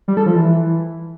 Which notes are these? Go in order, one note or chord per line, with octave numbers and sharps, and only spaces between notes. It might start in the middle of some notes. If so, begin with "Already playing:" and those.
G3
A4
F3
E3